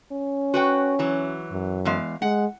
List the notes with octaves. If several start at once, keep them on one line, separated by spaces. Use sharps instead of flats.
C#4
F#4 B4 G5
E3 F#3
F#2
E2 G#3 F5
G#3 F#5